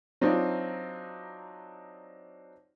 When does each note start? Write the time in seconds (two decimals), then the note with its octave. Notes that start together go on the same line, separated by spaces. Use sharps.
0.21 F#3 C4 D4 D#4 F4